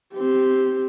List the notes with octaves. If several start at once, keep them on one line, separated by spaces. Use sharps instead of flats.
C4 G4